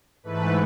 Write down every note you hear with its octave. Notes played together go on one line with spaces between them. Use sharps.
G#2 E3 A3 B4